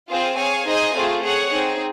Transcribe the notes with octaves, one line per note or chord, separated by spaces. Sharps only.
C4 F4 G#4 C5 F5
G#4 C#5 F5 G#5
D#4 G#4 C5 D#5 G#5
A3 C4 F4 G#4
G#4 C#5 F#5
C4 D#4 G#4